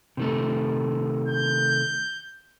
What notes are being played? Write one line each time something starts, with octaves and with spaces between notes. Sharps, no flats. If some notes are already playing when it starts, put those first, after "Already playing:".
C3 D#3 A3
G6